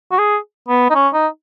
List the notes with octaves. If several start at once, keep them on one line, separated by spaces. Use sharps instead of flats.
F#4
G#4
B3
D#4
C#4
D#4